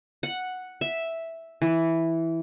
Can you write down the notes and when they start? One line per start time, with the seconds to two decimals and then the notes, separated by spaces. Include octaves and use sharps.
0.23 F#5
0.81 E5
1.62 E3